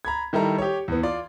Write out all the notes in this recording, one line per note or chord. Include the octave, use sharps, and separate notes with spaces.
A#5 B5 G#6
D#3 G3 E4 A4 A#5
G4 C#5
E2 B3
F4 D5 C6